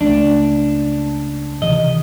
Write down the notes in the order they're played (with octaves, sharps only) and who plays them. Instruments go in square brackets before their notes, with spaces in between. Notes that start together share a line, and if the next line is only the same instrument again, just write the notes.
[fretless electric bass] C#2 A3 [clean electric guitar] D4
[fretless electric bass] C3 D#3 E3 [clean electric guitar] D#5